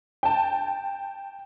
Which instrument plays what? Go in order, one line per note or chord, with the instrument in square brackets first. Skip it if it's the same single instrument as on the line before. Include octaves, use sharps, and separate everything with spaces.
[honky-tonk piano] G5 A5